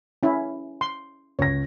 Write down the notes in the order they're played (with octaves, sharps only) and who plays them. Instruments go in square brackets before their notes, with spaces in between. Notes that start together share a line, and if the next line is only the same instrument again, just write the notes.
[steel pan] C#4 E4
C6
[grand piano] C#2 A#6 [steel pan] C#5